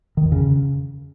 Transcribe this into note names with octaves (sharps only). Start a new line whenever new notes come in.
D#3
F2
C#3